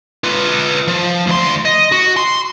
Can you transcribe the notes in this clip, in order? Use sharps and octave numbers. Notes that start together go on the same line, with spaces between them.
F4 B4
F3
D2 C6
D#5
F#4
C6